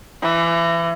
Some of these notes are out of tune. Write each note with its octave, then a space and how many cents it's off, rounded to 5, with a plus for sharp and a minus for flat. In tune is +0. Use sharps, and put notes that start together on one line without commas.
E3 +30